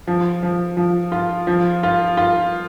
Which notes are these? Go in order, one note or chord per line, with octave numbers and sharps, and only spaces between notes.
F3
F3
F3
F4
F3
F4
F4